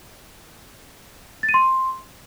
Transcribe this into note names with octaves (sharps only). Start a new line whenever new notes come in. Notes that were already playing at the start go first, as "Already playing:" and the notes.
A6
D#7
C6